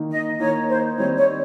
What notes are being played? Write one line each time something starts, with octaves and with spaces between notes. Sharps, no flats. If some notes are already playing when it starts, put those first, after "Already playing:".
Already playing: D#3 A#3 D#4
D#5
D#3 A#3 D#4 C#5
C5
D#3 G3 C4 D#4 C#5
C#5